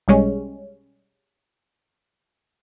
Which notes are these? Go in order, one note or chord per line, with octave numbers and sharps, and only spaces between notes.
B1 G3 G#3 C#4